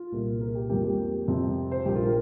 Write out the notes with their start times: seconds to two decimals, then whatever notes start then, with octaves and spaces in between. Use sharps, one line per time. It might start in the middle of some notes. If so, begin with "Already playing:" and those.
Already playing: F4
0.12 C2 A#2 A#3
0.41 A#4
0.55 G4
0.70 F2 F3 A#3 G4
0.84 G4
1.28 F2 C3 F3 C4
1.71 C5
1.85 A#1 A#2 G3 A#3 G4
1.95 F4
2.05 A#4